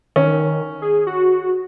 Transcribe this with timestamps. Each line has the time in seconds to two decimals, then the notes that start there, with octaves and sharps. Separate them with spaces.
0.16 D#3 C#4
0.82 G#4
1.07 F#4